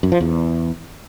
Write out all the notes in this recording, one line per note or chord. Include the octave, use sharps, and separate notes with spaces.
F#2
F3
E2